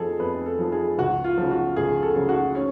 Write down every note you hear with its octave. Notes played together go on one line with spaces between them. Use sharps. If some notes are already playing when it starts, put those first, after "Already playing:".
Already playing: F2 F3 G#4 A4
F2 B4
A4
F3
G#4
C#2 F#4
F4
C#3 F3
F#4
C#2 G#4
A4
C#3 F3
F#4
C#4